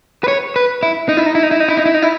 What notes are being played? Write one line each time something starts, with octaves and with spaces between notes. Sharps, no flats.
B4
C#5
B4
E4
D#4
E4
D#4
E4
D#4
E4
D#4
E4
D#4
E4
D#4
E4